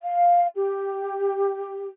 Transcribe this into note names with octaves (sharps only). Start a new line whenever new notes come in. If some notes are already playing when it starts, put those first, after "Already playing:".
F5
G4